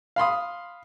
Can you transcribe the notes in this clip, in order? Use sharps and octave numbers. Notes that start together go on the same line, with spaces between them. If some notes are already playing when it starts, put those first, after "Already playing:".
F5 B5 C6 D#6